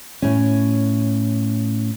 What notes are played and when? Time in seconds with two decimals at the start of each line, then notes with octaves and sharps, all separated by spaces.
0.22 A2 C#4